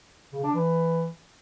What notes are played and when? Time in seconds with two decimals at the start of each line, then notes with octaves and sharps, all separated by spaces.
0.32 C#3
0.43 D4
0.55 E3